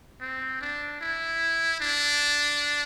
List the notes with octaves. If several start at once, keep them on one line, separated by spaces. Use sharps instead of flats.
C4
D4
E4
D4